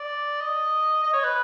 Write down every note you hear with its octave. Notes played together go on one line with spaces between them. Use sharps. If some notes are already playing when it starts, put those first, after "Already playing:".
Already playing: D5
D#5
D#5
C#5
B4